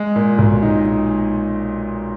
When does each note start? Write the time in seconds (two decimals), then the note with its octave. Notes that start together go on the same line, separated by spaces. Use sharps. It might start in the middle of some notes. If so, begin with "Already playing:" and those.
Already playing: G#3
0.16 A#2
0.39 B1
0.63 D#4
0.86 G#3